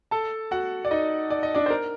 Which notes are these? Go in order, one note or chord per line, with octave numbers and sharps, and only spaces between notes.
A4 A5
F#4 F#5
D5
D#4 D#5
D5
D#5
D4 D5
C5
A#4